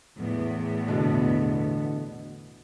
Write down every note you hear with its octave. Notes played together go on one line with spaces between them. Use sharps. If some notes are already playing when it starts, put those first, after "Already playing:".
E2 A2 B3
B2 D3